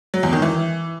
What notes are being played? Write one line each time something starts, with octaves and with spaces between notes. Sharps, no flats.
F#3
E2
D#3
E3